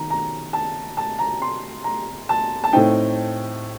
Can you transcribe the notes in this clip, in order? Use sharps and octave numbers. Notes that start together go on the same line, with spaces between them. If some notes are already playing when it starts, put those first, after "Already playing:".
Already playing: D#3 A#5
A#5
A5
A5
A#5
C6
A#5
A5
A5
A2 A3 C4 D#4 G5